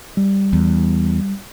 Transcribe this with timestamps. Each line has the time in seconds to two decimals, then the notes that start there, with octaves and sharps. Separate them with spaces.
0.17 G3
0.53 E2